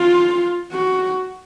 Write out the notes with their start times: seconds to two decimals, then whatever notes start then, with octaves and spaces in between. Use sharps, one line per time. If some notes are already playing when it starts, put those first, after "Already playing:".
Already playing: F4
0.72 F#4